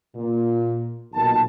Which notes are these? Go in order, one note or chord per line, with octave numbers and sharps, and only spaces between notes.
A#2
B1 A#2 D#3 A5